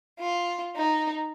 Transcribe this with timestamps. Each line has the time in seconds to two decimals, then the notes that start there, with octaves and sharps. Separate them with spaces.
0.21 F4
0.75 D#4